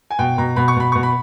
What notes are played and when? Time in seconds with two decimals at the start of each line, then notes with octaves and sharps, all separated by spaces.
0.11 G#5
0.19 B2 G5
0.38 B2 A#5
0.56 B2 B5
0.68 C#6
0.76 B2 B5
0.92 B2 C#6
1.03 B5